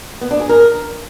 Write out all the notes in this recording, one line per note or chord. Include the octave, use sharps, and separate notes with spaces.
B3
D4
G#4
A#4